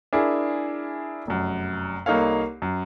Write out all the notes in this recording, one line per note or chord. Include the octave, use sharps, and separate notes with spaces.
D4 E4 G#4 A#4
F1 F#2
C2 A#3 D#4 A4 C#5 F5
F#2